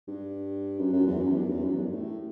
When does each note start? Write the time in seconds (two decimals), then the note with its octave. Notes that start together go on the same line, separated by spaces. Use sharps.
0.08 G2
0.79 F#2
0.93 F#2
1.07 E2
1.22 F#2
1.35 G2
1.50 E2
1.64 F#2
1.79 G2
1.93 A2